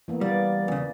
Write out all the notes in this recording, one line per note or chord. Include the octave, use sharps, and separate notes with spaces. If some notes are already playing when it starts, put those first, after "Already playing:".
E3 A#3 B3
G3 D5
E2 C#3